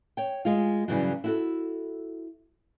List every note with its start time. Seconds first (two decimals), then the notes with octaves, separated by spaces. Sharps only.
0.17 C#5 G5
0.45 G#3 F4
0.88 G2 C#3 E3 F#3
1.24 E4 F#4 A4